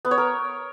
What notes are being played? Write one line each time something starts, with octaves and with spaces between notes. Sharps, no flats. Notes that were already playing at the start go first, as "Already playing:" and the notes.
B3
C#5
A#4